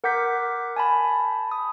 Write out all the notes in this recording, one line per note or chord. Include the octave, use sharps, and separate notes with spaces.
A#4 F#5 D6 G6 B6
G#5 A5 B5
D#6